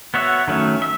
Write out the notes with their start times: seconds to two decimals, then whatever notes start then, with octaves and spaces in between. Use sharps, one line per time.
0.14 B3 F#4 C#5 E5
0.47 D#3 F#3 A3 C#4
0.82 E5